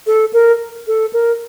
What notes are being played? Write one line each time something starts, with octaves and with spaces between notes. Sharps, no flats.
A4
A#4
A4
A#4